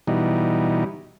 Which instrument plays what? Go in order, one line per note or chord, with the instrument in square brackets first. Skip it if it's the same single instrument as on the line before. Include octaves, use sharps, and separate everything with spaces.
[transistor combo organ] B2 E3 G3 D#4